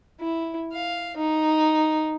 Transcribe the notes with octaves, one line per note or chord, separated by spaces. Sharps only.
E4
F5
D#4